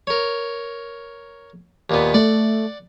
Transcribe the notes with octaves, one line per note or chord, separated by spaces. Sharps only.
A#4 C#5
D#2 A#2 B3
A3 D5 F#5